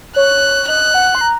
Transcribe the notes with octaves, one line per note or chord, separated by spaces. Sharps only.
C#5 F#6
D#5 F#6
F#5
C6
A#5